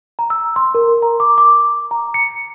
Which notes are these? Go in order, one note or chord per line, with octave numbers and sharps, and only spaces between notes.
A#5
E6
C6
A#4
A#5
D6
D6
A#5
C#7